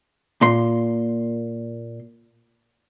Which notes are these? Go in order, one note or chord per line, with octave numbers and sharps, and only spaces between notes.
A#2 C6